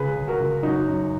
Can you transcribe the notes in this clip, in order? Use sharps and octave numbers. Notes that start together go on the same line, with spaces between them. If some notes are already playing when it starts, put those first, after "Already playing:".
Already playing: C#2 G#4 B4
C#2
F#4 A#4
C#2
F#2 D#4 F#4
F#2